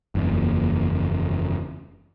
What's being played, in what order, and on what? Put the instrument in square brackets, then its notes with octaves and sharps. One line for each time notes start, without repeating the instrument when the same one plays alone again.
[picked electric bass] F#1 E2